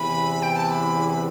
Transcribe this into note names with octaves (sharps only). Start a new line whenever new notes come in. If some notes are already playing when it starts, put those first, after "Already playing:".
Already playing: E2 C3 E3 B5
G5
A5
B5